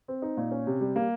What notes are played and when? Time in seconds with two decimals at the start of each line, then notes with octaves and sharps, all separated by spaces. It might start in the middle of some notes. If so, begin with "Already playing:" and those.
0.08 C4
0.22 D#4
0.37 A#2
0.51 C#4
0.67 C3
0.81 G3
0.96 A#3